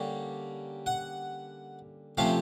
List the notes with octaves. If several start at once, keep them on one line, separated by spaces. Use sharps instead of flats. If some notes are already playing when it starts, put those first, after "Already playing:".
Already playing: D3 G3 A#3 C#4
F#5
C3 F3 A3 C#4 F5